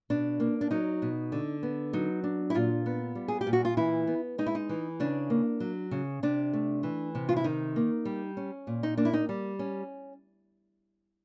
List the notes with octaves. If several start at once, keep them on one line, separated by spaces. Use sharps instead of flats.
B2 D4
A#3
D4
F#3 D#4
B2
D3
B3
F#3 D#4
D4
E4
A#2 F4
B3
G3
G#4
G4
A#2
F#4
F4
E3 E4
B3
G#3 D#4
E4
D#4
E3
C#3 D4
A#3
F#3
C#3
C3 D4
A3
E3
C3
F4
E4
D#3 D#4
A#3
G3
C#4
A#2
D#4
A#3 D4
E4
D#4
G3
C#4